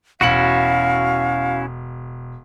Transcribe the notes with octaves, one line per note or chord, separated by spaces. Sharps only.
E1 C#4 E4 F#4 F5 C#7 F#7